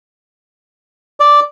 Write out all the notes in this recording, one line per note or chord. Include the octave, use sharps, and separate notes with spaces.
D5